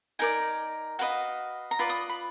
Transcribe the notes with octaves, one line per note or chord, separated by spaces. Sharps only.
D#4 A#4 D5 G#5
F#4 B4 D#5 F5
A#5
F4 B4 D5 B5
D#6
B5